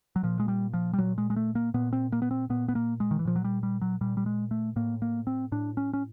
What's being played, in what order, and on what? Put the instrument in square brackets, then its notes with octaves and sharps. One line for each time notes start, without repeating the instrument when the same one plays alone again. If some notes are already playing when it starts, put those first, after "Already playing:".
[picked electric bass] F#3
A#2 F3
G#3
G3
F3
G3
A#2 F#3
G#3
G#3
A3
A#3
A#2 B3
C4
A#3
B3
C4
A#2 B3
B3
A#3
G#3
D#3
E3
A#2 F3
F#3
G3
G3
F#3
A#2 G3
G3
G#3
A3
A2 A#3
A#3
C4
A2 D4
C#4
C#4